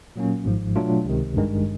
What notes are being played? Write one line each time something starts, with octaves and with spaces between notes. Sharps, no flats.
A#2 F#3 A#3 C#4
G#1 G#2 F3
B2 F#3 A3 D4 F4
C#2 C3 D#3
G#1 G2 D#3 G#3